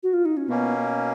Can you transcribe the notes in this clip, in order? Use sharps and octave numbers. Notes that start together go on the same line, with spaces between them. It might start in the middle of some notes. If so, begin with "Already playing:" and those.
F#4
F4
D#4
C#4
B2 A#3 B3 C#4